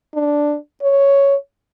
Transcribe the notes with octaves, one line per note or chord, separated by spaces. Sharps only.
D4
C#5